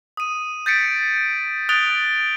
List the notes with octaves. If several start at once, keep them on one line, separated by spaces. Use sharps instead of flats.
D#6 D#7
G6 A6 B6 C#7 D7
D#6 F#6 A6 D7 F7 G7